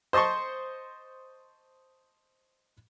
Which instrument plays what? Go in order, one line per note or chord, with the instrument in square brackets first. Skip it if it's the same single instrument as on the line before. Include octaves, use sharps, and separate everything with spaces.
[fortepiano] C5 D#5 A5 C6 C#6